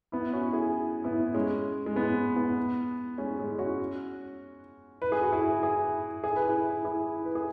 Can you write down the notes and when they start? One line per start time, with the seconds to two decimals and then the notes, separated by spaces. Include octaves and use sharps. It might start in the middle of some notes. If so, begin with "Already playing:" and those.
0.12 B3 E4
0.33 C#4 F#4
0.53 E4 G#4
1.04 B3 E4
1.34 G#3 C#4
1.86 G#3
1.96 B3
2.36 B3
3.18 G#3 C#4
3.39 G#3 C#4
3.58 C#4 F#4
5.02 B4
5.12 G#4
5.23 F#4
5.32 E4 G#4
5.62 E4 G#4
6.24 G#4
6.36 B4
6.48 E4 G#4
6.85 E4 G#4
7.25 B4
7.35 G#4